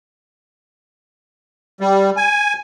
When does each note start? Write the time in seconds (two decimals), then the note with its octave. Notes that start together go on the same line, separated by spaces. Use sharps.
1.81 G3
2.17 G#5